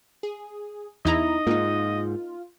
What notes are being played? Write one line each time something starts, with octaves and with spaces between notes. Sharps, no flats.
G#4
E2 D#4 E4 D#5 A#5
G#2 A#3 D#4 F4